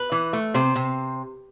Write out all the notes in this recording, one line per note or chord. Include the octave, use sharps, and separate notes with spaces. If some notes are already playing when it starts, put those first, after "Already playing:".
Already playing: B4
E3
A3
C3 C5
C3